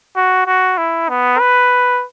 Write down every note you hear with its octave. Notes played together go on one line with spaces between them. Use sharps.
F#4
F#4
E4
B3
B4